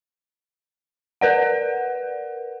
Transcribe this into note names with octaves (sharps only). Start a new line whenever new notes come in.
A#4 B4 D5 F#5